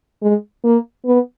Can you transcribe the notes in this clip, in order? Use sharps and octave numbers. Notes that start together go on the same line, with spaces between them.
G#3
A#3
B3